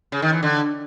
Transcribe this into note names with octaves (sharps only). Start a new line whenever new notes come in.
C#3
D#3
E3
D3